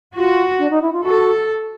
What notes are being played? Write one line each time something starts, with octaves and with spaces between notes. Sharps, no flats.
F4 F#4
D4
D#4
E4
F4
F#4 A4